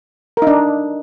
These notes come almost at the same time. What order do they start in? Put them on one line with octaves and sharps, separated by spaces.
A#4 D#4 D4